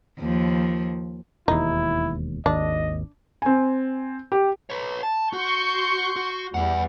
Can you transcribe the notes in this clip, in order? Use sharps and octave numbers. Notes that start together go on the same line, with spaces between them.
D#2 F3
E1 D#2 D#4 E4
G#1 D#2 D4 D#5
C4 G#5
G4
B4 C#5
A5
F#4 C6 C#6 G6
F#4
E2 G3 E5 F#5